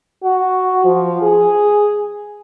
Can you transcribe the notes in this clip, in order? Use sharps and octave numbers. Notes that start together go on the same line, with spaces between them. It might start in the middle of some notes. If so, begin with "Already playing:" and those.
F#4
F3
G#4